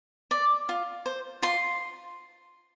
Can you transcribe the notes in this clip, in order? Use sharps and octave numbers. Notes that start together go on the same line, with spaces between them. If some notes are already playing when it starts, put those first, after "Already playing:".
D5
F4
C5
F4 C6